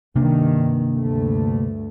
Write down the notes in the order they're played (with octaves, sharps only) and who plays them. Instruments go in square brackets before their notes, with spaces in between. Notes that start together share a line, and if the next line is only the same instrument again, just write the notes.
[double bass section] G2 D#3 [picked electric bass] C3 A#3 D4
[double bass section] D2 G2 A3